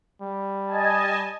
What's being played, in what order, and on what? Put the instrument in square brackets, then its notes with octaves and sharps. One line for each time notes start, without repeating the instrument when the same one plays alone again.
[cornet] G3
[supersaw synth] D#5 G#5 A5